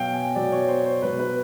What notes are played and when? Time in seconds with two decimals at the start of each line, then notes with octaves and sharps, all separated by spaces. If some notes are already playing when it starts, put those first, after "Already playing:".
Already playing: B2 F#3 F5 G5
0.14 G#5
0.35 B2 F#3 D5
0.52 C#5
0.68 C5
0.85 C5
1.02 B2 F#3 B4
1.19 B4